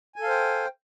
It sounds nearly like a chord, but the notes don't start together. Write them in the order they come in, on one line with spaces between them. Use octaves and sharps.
G#5 A4 F5 C5 G5